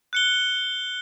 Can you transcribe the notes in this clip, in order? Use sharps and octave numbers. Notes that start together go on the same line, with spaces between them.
F#6 C#7 G7